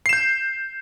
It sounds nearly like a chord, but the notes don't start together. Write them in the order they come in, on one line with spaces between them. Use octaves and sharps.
C7 E7 G6